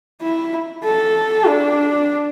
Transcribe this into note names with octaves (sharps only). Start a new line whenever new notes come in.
E4
A4
D4